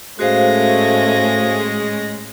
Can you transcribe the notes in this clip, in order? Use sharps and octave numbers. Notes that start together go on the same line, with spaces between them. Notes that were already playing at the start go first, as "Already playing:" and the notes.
A2 G#3 A3 C#4 F#4 C5 F5 A#6